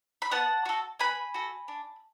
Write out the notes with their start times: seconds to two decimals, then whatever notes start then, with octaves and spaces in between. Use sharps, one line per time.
0.22 B5
0.31 B3 F#5 A5
0.65 F#4 A4
0.99 B3 G#5 B5
1.34 F#4 A4
1.68 D4